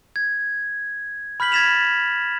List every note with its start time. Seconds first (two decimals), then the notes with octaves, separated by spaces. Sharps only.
0.16 G#6
1.40 B5 F6 G6 B6 F#7
1.52 G#6 A6 B6 E7 F7